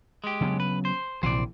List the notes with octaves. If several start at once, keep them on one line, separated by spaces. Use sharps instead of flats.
G#3 G4
C#3 F#3 B3
B4
C5
A#1 C3 E3 C5 D5